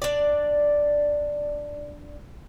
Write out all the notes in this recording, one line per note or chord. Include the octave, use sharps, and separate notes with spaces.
D4 D5